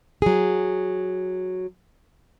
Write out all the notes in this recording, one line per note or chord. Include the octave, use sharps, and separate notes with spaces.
F#3 G#4